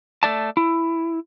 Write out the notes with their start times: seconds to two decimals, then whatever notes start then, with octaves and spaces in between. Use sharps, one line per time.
0.23 A3 D5 A5
0.57 E4